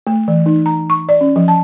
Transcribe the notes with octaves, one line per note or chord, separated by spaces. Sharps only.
A3
E3
D#4
A#5
C#6
D5
C#4
F3
A5